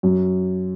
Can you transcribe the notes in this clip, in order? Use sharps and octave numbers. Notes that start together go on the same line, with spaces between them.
F#2